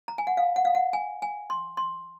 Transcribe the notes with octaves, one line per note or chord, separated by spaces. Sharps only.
A#5
G#5
F#5
F5
F#5
F5
F#5
G#5
G#5
C6
C6